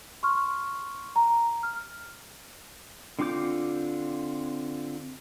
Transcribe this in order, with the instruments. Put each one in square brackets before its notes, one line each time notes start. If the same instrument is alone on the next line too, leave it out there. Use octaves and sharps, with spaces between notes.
[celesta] C6 C#6 F6
A#5
F6
[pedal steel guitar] D3 C4 F4 D6 G6